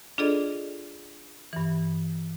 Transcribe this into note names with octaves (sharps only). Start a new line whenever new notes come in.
D4 F4 G#4 A4 D5 D#5
G2 E3